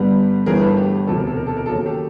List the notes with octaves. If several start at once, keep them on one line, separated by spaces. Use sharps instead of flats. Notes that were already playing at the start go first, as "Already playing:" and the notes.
Already playing: G2 D3 G3 B3
G1 G2 E3 A3 G#4 A#4
A4 B4
G4
E1 D2 C3 A4
A#4
A4
A#4
A4
A#4
D#2 C#3 F#3 A4
A#4
G4 A4